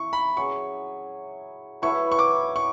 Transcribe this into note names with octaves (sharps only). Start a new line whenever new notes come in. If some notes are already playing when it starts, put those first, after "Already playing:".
Already playing: E4 C#6
B5
F#3 C#4 G#4 C#6
F#3 A3 E4 B4 C#6
C#6
D6
C#6